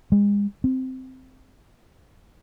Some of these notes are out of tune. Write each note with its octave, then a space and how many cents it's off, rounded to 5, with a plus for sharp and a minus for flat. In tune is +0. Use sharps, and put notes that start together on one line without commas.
G#3 -35
C4 -10